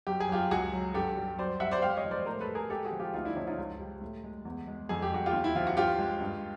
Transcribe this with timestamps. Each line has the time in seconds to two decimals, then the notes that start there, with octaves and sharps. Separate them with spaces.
0.07 F#2 G4
0.20 G#4
0.29 F#3 F4 G4
0.51 C#2 F#4 G#4
0.73 F#3
0.94 G2 G4 A4
1.17 G3
1.38 F#2 C5 D5
1.60 G3 E5 F#5
1.71 C5 D5
1.82 G#3 F5 G5
1.97 C#5 D#5
2.05 F3
2.11 C5 D5
2.26 A2 A#4 C5
2.41 A4 B4
2.48 G3
2.55 G#4 A#4
2.70 G#3 G4 A4
2.85 F#4 G#4
2.92 F3
2.99 F4 G4
3.14 D2 D#4 F4
3.25 D4 E4
3.35 F3 C#4 D#4
3.47 D#4 F4
3.58 C#2
3.80 G3
4.02 A2
4.24 G#3
4.45 E2
4.67 G#3
4.89 F2 G#4
5.02 G4
5.12 G3 F#4
5.26 F4 G4
5.33 D#2
5.44 E4
5.55 F3 F4
5.67 F#4
5.77 G2 F4 G4
5.99 G#3
6.21 G2